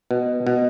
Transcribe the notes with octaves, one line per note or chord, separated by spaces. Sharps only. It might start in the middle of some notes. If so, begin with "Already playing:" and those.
B2
B2